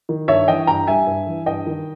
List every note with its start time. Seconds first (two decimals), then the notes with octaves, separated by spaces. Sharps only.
0.09 D#3
0.28 G2 C#5 E5
0.48 E3 D#5 G5
0.67 G2 G5 A#5
0.87 G3 E5 G#5
1.07 G2
1.27 E3
1.46 G2 D#5 G5
1.66 D#3